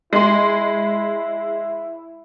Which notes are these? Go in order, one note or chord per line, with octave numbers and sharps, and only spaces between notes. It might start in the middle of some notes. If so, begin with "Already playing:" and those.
G#3 E4 C6